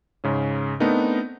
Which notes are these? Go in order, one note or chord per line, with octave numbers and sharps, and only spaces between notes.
G#2 C#3 C#4
A3 B3 C4 D4 D#4 A#4